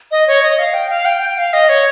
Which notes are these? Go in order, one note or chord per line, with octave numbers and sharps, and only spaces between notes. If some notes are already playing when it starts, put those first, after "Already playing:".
D#5
C#5
D#5
F5
G5
F5
G5
G5
F5
D#5
C#5